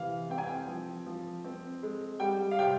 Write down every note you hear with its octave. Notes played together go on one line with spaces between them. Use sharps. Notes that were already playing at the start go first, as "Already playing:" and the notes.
Already playing: C3 E3 F5
C4 G5
G#5
G5
F3
F3
C4
G#3
G3 G5
F5
C3 G5